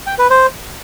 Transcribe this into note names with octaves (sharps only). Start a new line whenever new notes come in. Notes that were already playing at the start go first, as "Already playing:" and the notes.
G5
B4
C5